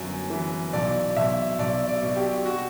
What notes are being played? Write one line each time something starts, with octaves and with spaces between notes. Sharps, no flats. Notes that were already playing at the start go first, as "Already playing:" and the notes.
Already playing: G1 F#2
E3
B1 D5
B1 E5
B1 D5
D5
B2
G4
F#4